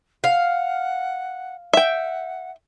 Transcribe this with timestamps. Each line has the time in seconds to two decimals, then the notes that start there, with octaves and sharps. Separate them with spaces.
0.24 F5 F#5
1.73 E5 F#5 G5